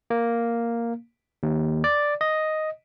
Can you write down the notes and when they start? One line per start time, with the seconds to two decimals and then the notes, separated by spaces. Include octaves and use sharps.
0.10 A#3
1.43 D#2
1.84 D5
2.21 D#5